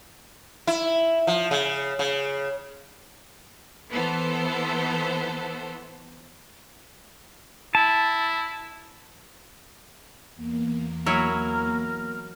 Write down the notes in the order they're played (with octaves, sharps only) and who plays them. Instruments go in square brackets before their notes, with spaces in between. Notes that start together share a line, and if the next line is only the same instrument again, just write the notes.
[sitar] E4
F3
C#3
C#3
[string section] E3 B3 A4 C5
[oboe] E4 [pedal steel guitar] A5
[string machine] E2 A#3
[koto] F#3 E4 C#5 [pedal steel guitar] A#4